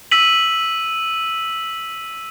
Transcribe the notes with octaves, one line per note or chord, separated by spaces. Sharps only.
E6 B6 D#7 F#7